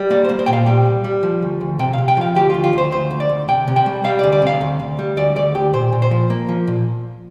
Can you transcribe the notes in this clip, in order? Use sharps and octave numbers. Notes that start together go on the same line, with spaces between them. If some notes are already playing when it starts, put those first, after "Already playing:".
Already playing: G3
A#3 D5
A#3 C5
C5
A#2 G5
F5
G3 G5
C2
G3
F3
D2
D2
C3 G5
C3 F5
G5
F3 F5
D2 G4
D2 F4
F4
D2 C5
D2 C5
D2
D5
D2
C3 G5
C3
G5
G3
G3 F5
D5
D2
D5
C3 F5
D2
D2
G3
D2 D5
D2 D5
D2 G4
A#2 C5
A#2
C5
F3
A#3
F3
A#2